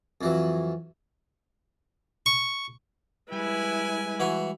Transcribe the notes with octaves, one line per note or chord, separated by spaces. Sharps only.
F2 E3 F#3
C#6
G3 G#3 E4 B4 G#5
E3 F#4